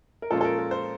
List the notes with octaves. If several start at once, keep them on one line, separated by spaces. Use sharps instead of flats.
A#4
A#2 F3 G#3 C#4 F4 A4
A4
A#4
A#4
C5